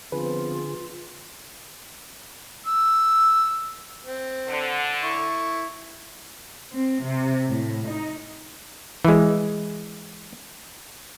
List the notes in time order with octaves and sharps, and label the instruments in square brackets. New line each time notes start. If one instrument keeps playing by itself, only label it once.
[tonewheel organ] D3 G#4 [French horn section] F3 B3 C4 [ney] F4 [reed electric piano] B4
[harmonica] E6
C4
[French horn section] D3
[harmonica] E4 C#6
[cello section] C4
C3
A2
D#4
[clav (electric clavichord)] E3 G#3